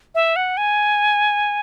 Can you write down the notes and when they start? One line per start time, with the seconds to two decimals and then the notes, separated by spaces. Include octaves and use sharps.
0.15 E5
0.36 F#5
0.57 G#5